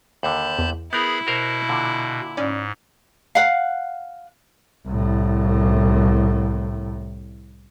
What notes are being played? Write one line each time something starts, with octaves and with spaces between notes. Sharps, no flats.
D#2 D3 A5 B5 G6
E2
B3 E4 G#4 A#4 B5 G6
B2 F#4 A#4 C5
A#2 D3
G#2 C#4 D5
F5 F#5
C2 A2